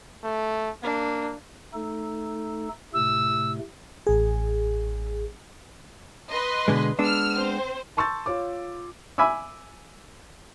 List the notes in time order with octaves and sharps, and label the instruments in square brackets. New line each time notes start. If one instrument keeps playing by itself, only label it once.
[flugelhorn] A3
[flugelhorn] A#3 [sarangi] D4
[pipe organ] A3 D#4 A4
[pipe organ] A2 C3 A3 [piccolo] E6
[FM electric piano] A1 G#4
[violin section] B4 D#5 C6
[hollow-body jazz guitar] B2 D3 G#3
[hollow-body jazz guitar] G#3 B3 D4 [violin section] E6 F6
[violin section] C4 C5
[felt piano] A5 C6 C#6 E6 G6 A6
F4 C#5 D6
[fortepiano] E5 G#5 B5 D6 E6